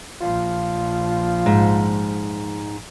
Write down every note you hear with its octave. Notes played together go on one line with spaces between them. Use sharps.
A#1 F3 F4
G#2